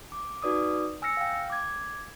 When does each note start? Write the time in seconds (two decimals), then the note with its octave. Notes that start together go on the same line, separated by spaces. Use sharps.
0.12 D6
0.42 D#4 F#4 B4 D5 D6 D#6
1.02 G#5 E6 F6 A#6 C#7
1.17 F5 G5
1.50 D6 G#6